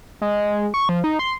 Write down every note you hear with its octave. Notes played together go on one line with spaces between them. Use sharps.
G#3
C#6
F3
D#4
C6